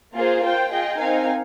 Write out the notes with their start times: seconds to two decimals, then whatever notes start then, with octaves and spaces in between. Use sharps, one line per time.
0.14 A#3 F4 G#4 C5
0.42 F4 C5 G5
0.70 F4 G#4 D#5 G5
0.98 C4 D#4 A#4 F5 G#5